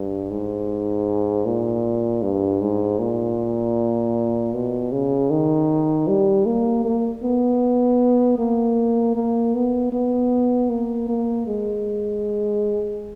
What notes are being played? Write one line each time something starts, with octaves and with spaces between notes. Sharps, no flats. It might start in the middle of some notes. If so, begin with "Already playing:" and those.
Already playing: G2
G#2
A#2
G2
G#2
A#2
B2
C#3
D#3
G3
A#3
A#3
B3
A#3
A#3
B3
B3
A#3
A#3
G#3